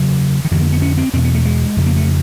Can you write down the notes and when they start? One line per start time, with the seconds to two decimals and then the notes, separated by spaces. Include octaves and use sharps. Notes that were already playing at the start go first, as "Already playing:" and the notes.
Already playing: E2 C#3 F#3
0.45 D#3
0.51 F2 D3 E3
0.61 A#3
0.72 B3
0.82 C#4
0.98 C4
1.13 E2 B2 C4
1.24 B3
1.35 A3
1.45 G#3
1.77 F2 C#3
1.86 A#3
1.96 A3